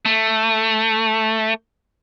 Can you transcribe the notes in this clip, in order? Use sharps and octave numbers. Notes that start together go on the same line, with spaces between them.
A3